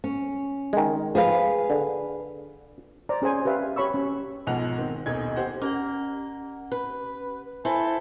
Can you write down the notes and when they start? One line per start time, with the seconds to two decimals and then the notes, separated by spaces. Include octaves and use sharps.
0.04 C#4
0.73 D#3 G#3
1.15 F3 G#4 B4 F5
1.70 D3
3.09 C5 D5 A#5
3.22 C#4 G#4 C5 G#5
3.45 G4 B4 E5 F5
3.76 G4 C#5 B5 C#6 E6
3.94 C#4
4.47 B1 G#2 B2 F3 F#5 F7
4.78 D#3 C4
5.06 D#1 B1 D#4 G#6
5.36 G4 C5 F#5
5.62 C#4 G4 A#4 F#5
6.72 B4
7.65 E4 A4 C5 G#5 B5 G7